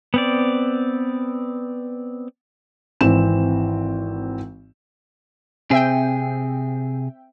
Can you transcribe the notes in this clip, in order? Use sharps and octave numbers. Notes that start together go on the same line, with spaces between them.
B3 C4 D5
G#1 E3 C4 E7
C3 C4 G#4 E5 G5